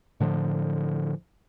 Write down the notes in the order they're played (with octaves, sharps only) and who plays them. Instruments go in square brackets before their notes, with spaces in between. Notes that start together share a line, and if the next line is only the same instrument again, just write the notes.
[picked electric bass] A2 D3 F3